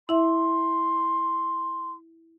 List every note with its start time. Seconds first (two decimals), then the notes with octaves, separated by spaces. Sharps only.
0.09 E4 E5 C6